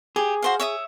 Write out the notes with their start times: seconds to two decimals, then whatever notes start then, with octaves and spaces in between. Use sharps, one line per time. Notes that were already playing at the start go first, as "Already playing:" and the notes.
0.16 G4 G#4
0.42 F#4 C5 F5
0.60 C#5 E5 D#6